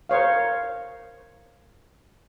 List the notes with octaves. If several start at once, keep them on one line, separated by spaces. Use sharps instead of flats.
A#4 C5 C#5 F5